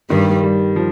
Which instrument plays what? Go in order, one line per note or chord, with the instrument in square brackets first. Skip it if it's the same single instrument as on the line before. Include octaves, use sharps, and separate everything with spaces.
[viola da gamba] G2 G3 [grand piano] D#3
[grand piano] G3
F3